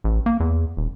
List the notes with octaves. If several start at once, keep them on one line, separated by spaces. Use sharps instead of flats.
A1
A#3
E2
D#1